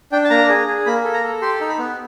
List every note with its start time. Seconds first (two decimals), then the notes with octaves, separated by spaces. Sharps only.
0.12 D4 G5
0.24 A5
0.30 A#3 A#5
0.49 G#4
0.67 G#4
0.86 A#3 B5
1.04 A4
1.14 A#5
1.23 A4
1.41 G4 C6
1.60 D#4
1.69 B5
1.78 B3